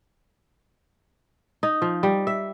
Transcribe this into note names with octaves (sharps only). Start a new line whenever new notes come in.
D#4
F3
G3
E5